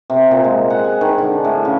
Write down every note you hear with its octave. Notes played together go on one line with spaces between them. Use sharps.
C3
A#2
G#3
F#5
G#5
D#3
D3
A2
C#3